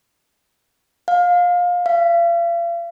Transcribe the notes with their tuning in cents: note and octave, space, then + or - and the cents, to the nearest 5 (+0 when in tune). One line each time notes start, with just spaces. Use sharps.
F5 +25
F5 -40